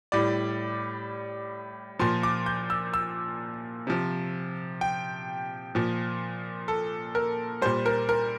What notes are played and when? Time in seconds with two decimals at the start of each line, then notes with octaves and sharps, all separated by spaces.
0.12 A2 G3 D5
1.99 A#2 F3 C6
2.23 D6
2.46 G6
2.70 E6
2.94 E6
3.87 C3 F3
4.81 G5
5.75 A#2 F3
6.68 A4
7.15 A#4
7.61 G3 C5
7.66 A#2
7.86 A#4
8.09 A#4